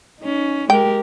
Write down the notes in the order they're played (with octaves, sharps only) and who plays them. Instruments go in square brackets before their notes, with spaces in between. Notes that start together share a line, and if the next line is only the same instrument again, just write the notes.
[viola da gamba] C#4 D#4
[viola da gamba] G#3 G4 A#4 [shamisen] G5